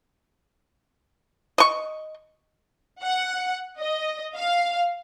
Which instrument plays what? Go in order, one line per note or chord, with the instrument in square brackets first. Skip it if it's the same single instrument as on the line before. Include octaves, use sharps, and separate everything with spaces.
[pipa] D#5 C#6
[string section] F#5
D#5
F5